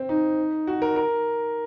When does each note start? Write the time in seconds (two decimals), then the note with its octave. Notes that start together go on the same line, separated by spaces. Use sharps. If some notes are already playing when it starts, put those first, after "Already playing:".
Already playing: C4
0.09 D#4
0.67 F#4
0.82 A#4
0.96 A#4